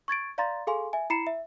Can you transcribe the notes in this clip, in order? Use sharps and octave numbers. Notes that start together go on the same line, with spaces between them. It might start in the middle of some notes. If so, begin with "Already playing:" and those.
C#6 G#6 A6 D7
D5 F5 A#5 C6 A6
G#4 A4 F5 G#5 C6
E5 G#5
E4 A#5 B5 C7 C#7 E7
E5